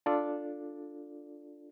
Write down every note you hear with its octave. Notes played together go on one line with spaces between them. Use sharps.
D4 F4 A4 D5